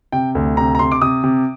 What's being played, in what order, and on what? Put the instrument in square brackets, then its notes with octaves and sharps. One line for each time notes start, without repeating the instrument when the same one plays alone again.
[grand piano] C3 G5
D2
C3 A#5
A#5
C3 C6
D6
C3 D#6
C3